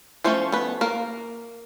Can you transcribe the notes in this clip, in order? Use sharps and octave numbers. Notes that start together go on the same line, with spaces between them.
F3 A3 C#4 C5
B3 B4
A#3 A#4